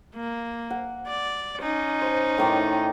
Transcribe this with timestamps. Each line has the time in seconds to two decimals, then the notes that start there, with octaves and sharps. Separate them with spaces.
0.15 A#3
0.70 F#5
1.07 D5
1.60 C#4 D#4
2.01 C5 A5
2.38 A2 D#3 D5